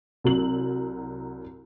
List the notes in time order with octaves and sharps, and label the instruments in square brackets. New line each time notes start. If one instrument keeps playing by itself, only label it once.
[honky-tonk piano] C2 F#3 F#7